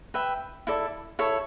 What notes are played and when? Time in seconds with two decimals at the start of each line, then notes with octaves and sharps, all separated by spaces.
0.14 B4 E5 G5
0.67 E4 A4 D5
1.19 E4 A4 C#5